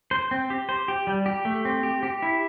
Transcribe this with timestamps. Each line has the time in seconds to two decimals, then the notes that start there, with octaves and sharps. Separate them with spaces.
0.11 C5
0.31 C4
0.50 G4
0.69 C5
0.88 G4
1.07 G3
1.26 G4
1.45 A3
1.65 C4
1.83 G4
2.03 G4
2.22 E4